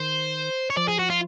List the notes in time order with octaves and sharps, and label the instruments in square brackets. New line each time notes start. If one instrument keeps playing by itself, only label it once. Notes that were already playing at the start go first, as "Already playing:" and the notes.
Already playing: [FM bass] D#3 [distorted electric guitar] C5
[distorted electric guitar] C#5
[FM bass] F3 [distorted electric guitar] D5
[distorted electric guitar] G#4
F#4
F4